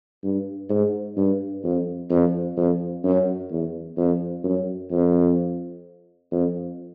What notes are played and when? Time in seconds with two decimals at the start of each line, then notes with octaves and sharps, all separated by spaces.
0.24 G2
0.69 G#2
1.17 G2
1.64 F2
2.10 F2
2.57 F2
3.04 F#2
3.51 E2
3.97 F2
4.44 F#2
4.91 F2
6.32 F2